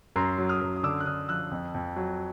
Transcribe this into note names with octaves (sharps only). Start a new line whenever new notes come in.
F#2 A#5 C6
F#3
D#6 F6
F#2
D#6
D3 D6 E6
F#6
D3 D#6 F6
F3 E6 F#6
F2
F2
F#3